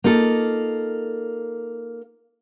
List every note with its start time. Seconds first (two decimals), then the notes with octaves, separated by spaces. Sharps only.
0.04 A#3 D#4 F4 A4